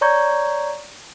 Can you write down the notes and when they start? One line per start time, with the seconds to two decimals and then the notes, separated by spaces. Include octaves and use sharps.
0.01 C#5 D5 A#5 C#6 G6 G#6